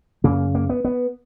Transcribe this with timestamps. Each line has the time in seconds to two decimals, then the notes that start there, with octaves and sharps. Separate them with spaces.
0.24 F#2 C#3 A#3
0.55 A#3
0.69 B3
0.84 B3